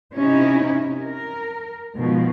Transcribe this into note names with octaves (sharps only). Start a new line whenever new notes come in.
C3 C#4 D#4 E4
A#4
B2 D#3 F3 G#3